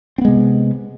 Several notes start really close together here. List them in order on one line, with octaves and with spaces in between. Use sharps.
C4 B3 G#3 C3